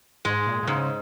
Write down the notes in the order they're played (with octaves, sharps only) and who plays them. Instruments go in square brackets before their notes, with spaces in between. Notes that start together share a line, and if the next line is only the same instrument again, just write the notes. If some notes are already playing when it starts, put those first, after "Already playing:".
[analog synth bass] G#2 [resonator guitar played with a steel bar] G#3
[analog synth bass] A#2
A#2
[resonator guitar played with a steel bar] G#2 [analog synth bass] C#3